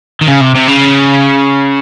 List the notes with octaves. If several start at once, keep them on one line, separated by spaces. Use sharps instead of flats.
D#3
C#3
C3
C3
C#3